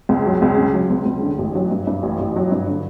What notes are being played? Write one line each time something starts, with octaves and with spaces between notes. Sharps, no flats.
C#2
F#3
C#2
C#3
F#3
C#2
C#2
D3
A1
F#3
G2
G2
A1
A1
F#3
G2
D3